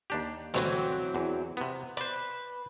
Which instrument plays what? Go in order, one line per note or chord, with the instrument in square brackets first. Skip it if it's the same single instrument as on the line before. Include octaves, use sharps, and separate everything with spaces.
[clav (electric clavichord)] D#2 D4 G4
[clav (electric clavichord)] D2 G2 B2 [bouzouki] E3 F#3 C4
[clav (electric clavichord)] E2
C3 B3
[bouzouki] B4 [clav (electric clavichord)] C5 D5